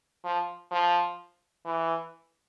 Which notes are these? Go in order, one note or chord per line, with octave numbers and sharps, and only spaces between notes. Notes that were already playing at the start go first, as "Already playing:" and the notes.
F3
F3
E3